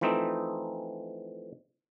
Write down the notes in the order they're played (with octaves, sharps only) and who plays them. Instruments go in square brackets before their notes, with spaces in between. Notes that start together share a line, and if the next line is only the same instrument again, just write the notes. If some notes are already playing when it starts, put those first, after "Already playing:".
[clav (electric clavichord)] E3 F3 A3 C4 D#4